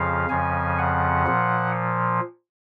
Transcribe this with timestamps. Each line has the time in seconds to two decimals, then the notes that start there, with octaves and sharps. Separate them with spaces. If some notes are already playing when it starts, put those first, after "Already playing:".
Already playing: F2 C#3 F3 F5
0.29 F2 C#3 F3 G#5
0.78 F#5
1.26 A#2 F3